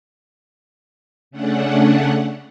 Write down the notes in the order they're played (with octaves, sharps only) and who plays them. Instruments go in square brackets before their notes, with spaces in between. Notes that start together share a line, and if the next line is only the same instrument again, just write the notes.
[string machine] C#3 A3 C#4 D4 F#5